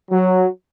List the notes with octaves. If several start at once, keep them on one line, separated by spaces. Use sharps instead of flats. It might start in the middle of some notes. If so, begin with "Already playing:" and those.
F#3